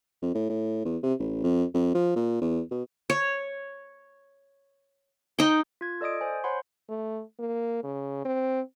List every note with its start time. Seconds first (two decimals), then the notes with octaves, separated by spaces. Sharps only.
0.22 F2
0.35 A2
0.50 A2
0.85 E2
1.03 C3
1.19 A1
1.44 F2
1.74 F2
1.95 F3
2.16 A#2
2.42 E2
2.71 B2
3.10 C#5
5.39 D#4 G5
5.81 F4 G#6
6.01 A4 D5 D#5 D#6 D7
6.21 C5 G#5
6.44 C5 C#5 F#5 B5 C6
6.89 A3
7.40 A#3
7.84 C#3
8.25 C4